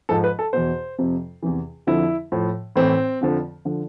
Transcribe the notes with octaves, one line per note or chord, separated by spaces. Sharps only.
G#2 F3 A4
B4
A4
E2 B2 C5
F2 C3 F3
E2 C3 E3
F2 D3 F3 E4
A2 F3
A2 E3 C4
F2 D3 F3
D3 F3